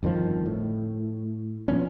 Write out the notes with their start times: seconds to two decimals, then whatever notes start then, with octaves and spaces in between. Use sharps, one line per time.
0.03 G1 F2 D#3 F3
0.46 A2
1.68 A#2 F3 B3 C#4